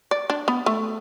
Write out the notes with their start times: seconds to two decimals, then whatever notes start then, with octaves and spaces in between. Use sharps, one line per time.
0.11 D5
0.30 D4
0.48 B3
0.66 A3